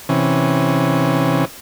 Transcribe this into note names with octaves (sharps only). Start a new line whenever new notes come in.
C3 E3 C#4